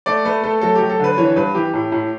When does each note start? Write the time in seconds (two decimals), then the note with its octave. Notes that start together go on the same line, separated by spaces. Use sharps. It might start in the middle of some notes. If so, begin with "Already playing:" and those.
0.06 A3 D5
0.25 A3 B4
0.43 A3 A4
0.61 F#3 A4
0.75 G4
0.81 F#3
0.90 A4
0.99 D3 B4
1.18 E3 C#5
1.36 G2 B4
1.55 E3 G4
1.74 A2
1.92 A2